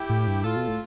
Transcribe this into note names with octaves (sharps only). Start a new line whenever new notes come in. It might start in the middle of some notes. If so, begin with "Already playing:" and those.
Already playing: E4 G4
A2
G2
A2 F4 A4
B2
A2